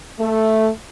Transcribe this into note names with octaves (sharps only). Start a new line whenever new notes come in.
A3